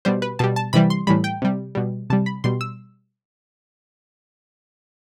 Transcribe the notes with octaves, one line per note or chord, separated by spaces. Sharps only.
B2 G3 C5
B4
B2 G3 A5
A5
C3 E3 G3 B5
C6
A2 E3 G3 B5
G5
C3 G3
B2 G3
C3 G3 A5
B5
B2 G3 C6
E6